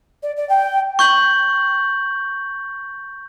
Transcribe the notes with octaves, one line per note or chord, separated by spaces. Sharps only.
D5
D5
G5
C#6 G6 F#7